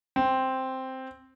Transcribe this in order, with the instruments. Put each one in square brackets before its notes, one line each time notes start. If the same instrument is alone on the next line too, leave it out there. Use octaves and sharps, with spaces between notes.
[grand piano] C4